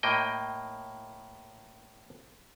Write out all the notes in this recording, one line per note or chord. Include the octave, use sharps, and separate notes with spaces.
A2 A#3 D#5 G5